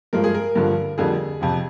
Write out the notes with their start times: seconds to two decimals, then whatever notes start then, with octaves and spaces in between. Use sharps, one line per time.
0.13 G2 F3 G#3 A#4
0.24 G#4
0.35 A#4
0.56 G2 D3 F3
0.98 F2 D3 G3 A#3 G#4
1.41 F2 C3 F3